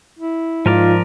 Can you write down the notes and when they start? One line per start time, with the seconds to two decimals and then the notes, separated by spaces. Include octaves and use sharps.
0.19 E4
0.66 G#2 F3 D#4 F4 A#4 D5